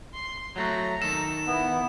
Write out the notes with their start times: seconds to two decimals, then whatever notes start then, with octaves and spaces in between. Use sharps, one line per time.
0.14 C6
0.56 F#3 A3 F#4 A#5
1.02 D#3 A4 E7
1.47 B3 E4